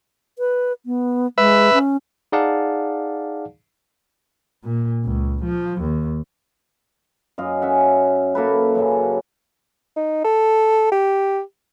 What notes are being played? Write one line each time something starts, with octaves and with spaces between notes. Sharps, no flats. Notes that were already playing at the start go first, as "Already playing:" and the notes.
B4
B3
G#3 B4 E5
C#4
D#4 G#4 D5 F5 F#5 A5
A#2
C#2
F3
D#2
F#2 D#5 F5
C#4 E5 F#5
A#3 A4 B4
F#2 C#3 F#3
D#4
A4
G4